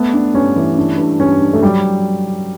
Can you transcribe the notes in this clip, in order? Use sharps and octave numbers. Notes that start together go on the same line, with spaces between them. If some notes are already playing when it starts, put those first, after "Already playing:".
Already playing: A3 B3
D4
G2 C#4
E3
D4
G2
G2 C#4
D4
A3
F#3 G3